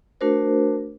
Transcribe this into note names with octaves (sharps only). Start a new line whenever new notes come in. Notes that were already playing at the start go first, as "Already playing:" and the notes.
A3 D4 F#4 A#4 C5